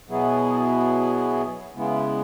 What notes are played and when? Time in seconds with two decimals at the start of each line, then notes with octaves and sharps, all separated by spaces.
0.08 B2 F#3 B3 E4 G#4
1.75 C#3 G#3 B3 E4